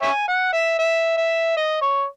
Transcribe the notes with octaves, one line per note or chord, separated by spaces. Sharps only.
C#5 E5 G#5
F#5
E5
E5
E5
D#5
C#5